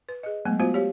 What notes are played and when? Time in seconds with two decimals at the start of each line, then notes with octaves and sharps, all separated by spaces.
0.09 B4
0.23 G#4 D#5
0.45 F#3 G#3 A3 B3
0.60 B3 F4 F#4 C5 F5
0.74 G4 C#5 F5